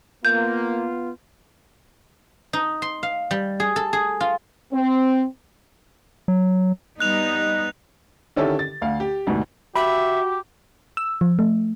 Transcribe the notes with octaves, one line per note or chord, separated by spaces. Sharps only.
A#3 B3 F4 G6
D#4
C6
F5
G3
G#4
A4
G#4
F4
C4
F#3
G3 B3 D#4 F#6 F7
D3 D#3 C#4 E4 G4 A4
A6
D2 F5
G4
D2 G#2 B2
F#4 G4 E5 B5
E6
F3
A3